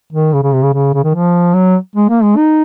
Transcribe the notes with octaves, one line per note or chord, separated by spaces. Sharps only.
D#3
C#3
C#3
C3
C#3
C#3
C#3
D#3
F3
F#3
G#3
A#3
G#3
D#4